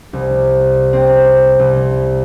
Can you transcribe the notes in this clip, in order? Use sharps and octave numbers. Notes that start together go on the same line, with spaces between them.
C2
C4
C2